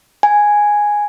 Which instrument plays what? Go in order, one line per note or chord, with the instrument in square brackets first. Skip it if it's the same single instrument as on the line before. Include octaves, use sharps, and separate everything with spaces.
[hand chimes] G#5